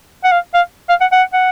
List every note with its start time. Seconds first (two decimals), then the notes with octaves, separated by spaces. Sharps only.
0.24 F#5
0.32 F5
0.54 F5
0.89 F5
1.01 F#5
1.12 F#5
1.34 F#5